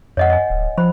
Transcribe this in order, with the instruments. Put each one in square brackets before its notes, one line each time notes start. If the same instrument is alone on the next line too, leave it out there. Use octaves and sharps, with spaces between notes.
[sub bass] F2 [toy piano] C#5 D#5 F#5
[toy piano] D#5 G#5
[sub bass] D1
[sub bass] F3 [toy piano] C5 B5